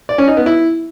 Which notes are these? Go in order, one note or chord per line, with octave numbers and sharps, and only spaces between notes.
D5
C#4
D#4
B3
E4